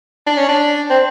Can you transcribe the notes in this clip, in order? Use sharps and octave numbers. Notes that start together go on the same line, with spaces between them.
D4
C#4
D4
C4